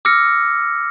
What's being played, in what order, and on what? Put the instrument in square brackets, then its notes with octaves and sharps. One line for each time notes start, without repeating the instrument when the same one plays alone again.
[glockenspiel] D6 E6 F6 A#6 C#7